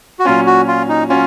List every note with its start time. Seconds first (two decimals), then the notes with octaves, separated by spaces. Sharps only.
0.19 F#4
0.25 A#2 F#3 C#4 F4
0.47 F#4
0.68 F4
0.89 D#4
1.10 F#3 C#4 F4